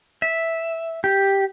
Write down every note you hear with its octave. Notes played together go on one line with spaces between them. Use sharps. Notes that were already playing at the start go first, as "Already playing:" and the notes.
E5
G4